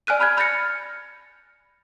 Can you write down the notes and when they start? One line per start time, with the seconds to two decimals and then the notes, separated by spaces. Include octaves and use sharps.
0.07 D5 G#5 F6 F#6 D#7
0.20 A5 B5 F6 F#6 G#6
0.37 B5 F6 G6 A6 A#6 C#7